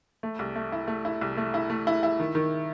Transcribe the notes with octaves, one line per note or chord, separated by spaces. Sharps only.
A3
C2
A3
E4
A3
E4
C2
A3
E4
A3
E4
E4
D#3
D#3